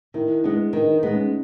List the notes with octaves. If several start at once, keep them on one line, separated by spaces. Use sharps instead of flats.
D#3 E4
G#3 B3 D4
D#3 D#4
D#4
G#3 B3
C#4